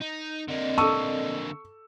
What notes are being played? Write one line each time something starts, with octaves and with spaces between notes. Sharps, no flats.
D#4
D3 A#3 C4 D5 D#5
A4 A5 C#6 E6